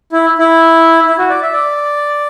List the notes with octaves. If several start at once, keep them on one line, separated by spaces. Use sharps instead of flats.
E4
E4
E4
F#4
D5
E5
D5